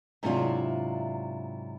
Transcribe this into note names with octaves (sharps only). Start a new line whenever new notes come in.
G#2 C3 F#3 D4 E4 F4